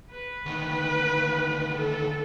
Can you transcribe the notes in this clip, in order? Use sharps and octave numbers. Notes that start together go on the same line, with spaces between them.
B4
D2 D#3
A4